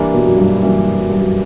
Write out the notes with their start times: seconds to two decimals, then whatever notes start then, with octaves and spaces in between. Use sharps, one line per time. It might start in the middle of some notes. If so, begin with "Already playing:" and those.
Already playing: E3 G3 A#3 D4
0.13 B2
0.26 F#2
0.37 G2
0.62 F#2 E3 G3 A#3 D4
0.99 F#2
1.10 G2
1.19 F#2